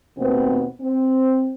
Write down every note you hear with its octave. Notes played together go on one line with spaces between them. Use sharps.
D#2 B2 A3 B3 C4
C4